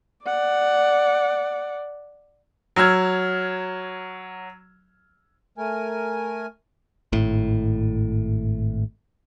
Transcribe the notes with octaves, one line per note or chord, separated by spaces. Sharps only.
D5 F#5
F#3 E6 F6 G#6
A3 A#4 G#5
G#1 A2